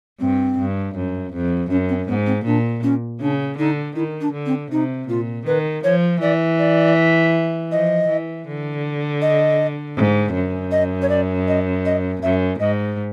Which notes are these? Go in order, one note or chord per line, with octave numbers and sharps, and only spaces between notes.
G2 C4
G2
F#2
F2
F#2 C#4
C4
G#2 B3
C4
A#2 D4
C#4
C#3 D4
D3 D#4
D#3 E4
D4
D3
C4
C3 D#4
A#2 F4
D#3 B4
F3 C#5
E3 D5
D5
F3 D#5
E3
D3
D#5
G#2
F#2
D#5
C#5
D5
D#5
D#5
F#2 E5
G#2 D#5